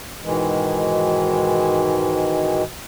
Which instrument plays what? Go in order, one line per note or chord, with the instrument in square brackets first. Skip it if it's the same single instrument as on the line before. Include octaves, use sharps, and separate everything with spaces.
[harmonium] G#2 B2 D#3 E3 G#3